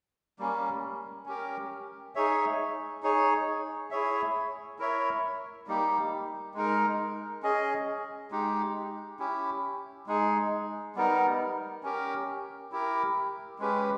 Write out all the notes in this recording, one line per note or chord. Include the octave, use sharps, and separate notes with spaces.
G3 A#3 C#4
C#4 G4 A#4
D#4 G#4 C#5 E5
D#4 G#4 C#5
E4 G#4 C#5 E5
E4 A#4 C#5 E5
G3 A#3 D#4 G4
G#3 D#4 A#4
C#4 G#4 D#5
G#3 D#4 G4
C#4 E4 G4
G#3 D#4 G#4
G3 B3 D#4 A#4
C#4 G4 A#4
E4 G4 A#4
G#3 C#4 G4 B4